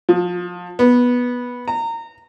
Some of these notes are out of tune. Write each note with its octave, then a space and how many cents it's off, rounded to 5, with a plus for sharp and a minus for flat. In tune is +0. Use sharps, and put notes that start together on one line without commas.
F3 +25
B3 -10
A#5 -25